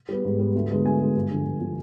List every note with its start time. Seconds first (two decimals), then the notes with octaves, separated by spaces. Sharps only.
0.09 G3 B3
0.25 G#2
0.39 G3 B3
0.55 D2
0.70 D3 G#3 B3
0.85 D2 G#5
1.01 D3 G#3 B3
1.16 G2
1.31 D3 F3
1.45 G2
1.61 D3 F3